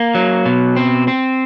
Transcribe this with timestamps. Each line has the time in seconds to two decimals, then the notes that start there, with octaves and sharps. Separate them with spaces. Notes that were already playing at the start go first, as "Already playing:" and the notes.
Already playing: A#3
0.15 F#3
0.45 B2
0.76 C4
1.08 C4